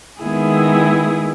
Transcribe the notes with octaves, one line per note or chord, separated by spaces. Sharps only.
D#3 G#3 B3 E4 G#4